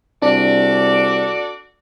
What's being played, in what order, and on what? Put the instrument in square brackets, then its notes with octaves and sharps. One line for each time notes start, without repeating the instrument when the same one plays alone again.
[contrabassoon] C2 [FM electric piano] D4 [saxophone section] F#4 A4 D5